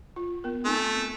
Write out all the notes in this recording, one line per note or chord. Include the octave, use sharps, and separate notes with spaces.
F4
B3 A#4
A3 C4 D#4 G#5